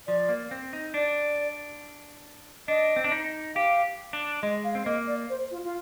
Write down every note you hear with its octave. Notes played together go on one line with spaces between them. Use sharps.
F3 D5
A#3
C4
D#4
D4 D5
D4 D#5
C4
D4
D#4
G4 F5
D4
G#3 D#5
F5
C4
A#3 D#5
D5
C5
F4
F4